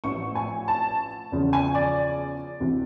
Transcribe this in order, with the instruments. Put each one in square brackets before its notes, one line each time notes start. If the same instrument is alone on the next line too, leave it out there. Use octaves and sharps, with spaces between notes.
[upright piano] A1 A2 F3 C#6
G#5
A5
E2 C#3 F3
G#5
D5
D2 C3 E3